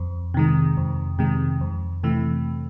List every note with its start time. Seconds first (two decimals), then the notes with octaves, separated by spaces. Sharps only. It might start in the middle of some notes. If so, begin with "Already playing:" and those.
Already playing: F2
0.34 C3 D#3 G#3
0.77 F2
1.19 C3 D#3 G#3
1.61 F2
2.03 C3 E3 A3